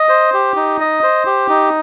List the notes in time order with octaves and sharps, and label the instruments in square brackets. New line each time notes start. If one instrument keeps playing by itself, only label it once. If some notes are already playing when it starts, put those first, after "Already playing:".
Already playing: [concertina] D#5
C5
G4
D#4
D#5
C5
G4
D#4